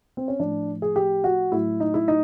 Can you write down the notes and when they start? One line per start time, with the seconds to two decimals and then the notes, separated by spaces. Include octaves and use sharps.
0.17 C4
0.28 C#4
0.40 A2 F3 D4
0.82 G#4
0.96 G4
1.24 F#4
1.52 A2 F#3 E4
1.80 D#4
1.94 E4
2.08 D#4